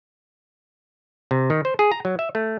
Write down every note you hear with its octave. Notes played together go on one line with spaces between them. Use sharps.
C3
D#3
C5
G#4
A#5
F#3
E5
A3